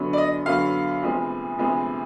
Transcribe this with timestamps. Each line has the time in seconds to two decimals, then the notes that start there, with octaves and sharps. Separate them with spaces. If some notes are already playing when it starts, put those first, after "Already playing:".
Already playing: F#2 D3 F#3 B3
0.13 D5
0.18 D#5
0.46 F#2 D3 F#3 B3 F5
1.03 D2 C3 F3 G#3 B3
1.58 D2 C3 F3 G#3 B3